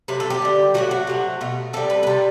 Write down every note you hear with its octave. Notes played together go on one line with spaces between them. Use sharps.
C3 F#3 A3 B4
A4
G4
D3 G3
A2 F#3 A3 F#4
F#4
C3 F#3 A3
B2 A3
C3 G3 A4
B4
B4
C3 G3 A4